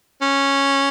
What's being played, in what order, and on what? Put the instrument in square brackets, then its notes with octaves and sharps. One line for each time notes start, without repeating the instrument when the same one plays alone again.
[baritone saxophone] C#4